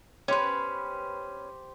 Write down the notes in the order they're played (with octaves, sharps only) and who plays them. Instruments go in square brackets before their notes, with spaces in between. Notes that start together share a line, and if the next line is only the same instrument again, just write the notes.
[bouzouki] C#4 B4 [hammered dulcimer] G4 C5